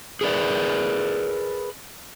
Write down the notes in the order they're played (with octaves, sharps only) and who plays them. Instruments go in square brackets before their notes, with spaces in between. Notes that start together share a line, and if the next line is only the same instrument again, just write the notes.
[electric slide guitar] G#4 A#4 B4 D5